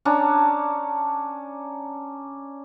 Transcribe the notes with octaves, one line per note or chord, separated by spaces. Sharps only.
C#4 D4 A5 A#5